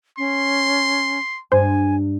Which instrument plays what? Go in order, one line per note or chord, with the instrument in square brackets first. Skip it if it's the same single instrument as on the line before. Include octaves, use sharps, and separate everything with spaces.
[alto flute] C#4 [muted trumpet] C6
[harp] G2 [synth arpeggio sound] C5 [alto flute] G#5